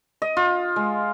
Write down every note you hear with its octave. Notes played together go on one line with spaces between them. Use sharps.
D#5
F4
G#3